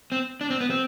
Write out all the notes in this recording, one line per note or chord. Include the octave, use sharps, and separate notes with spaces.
C4
D4
C4
B3
C4